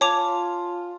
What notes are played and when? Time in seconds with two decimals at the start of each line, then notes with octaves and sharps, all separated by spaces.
0.01 F4 C#5 G#5 A5 D6 F7